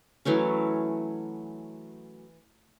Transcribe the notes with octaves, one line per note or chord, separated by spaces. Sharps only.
E3 F#3 A3 C#4